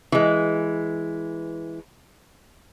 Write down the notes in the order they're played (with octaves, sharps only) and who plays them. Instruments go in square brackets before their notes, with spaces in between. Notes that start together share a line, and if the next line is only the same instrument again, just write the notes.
[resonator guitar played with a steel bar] E3 G#3